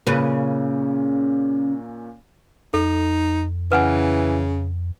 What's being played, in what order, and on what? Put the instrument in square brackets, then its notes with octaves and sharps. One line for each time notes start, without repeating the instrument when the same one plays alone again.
[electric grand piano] A#2 A#3 C#4 [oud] C#3 B4
[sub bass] F2 [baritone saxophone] D#4 [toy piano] A4
[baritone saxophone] C#3 [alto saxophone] E3 [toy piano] B4 F#5 G#5